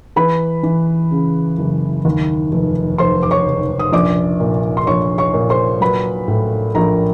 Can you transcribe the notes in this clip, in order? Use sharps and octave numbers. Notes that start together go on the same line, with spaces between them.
E3 B4 B5
E3
C#3
F#1
D#2
F1
F1 C5 C6
D6
C#5 C#6
F1
D#6
A#1 D5 D6
A#2
C6
A#1 C#5 C#6
C#5 C#6
A#2
C5 C6
F#3 B4 B5
A2
A#1 A#4 A#5